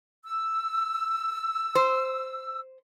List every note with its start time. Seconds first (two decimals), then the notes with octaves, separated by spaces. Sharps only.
0.25 E6
1.75 C5